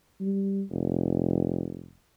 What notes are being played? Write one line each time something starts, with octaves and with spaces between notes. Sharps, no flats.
G3
F1